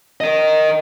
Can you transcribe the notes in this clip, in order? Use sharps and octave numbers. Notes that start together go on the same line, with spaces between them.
A#4 D#5